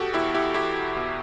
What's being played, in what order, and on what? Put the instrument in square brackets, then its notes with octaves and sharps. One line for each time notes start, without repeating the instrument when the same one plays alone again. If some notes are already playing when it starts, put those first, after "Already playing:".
Already playing: [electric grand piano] B2 F#4 G4 A4
E2 E4 G4
E4 G4
E2 E4 G4
B2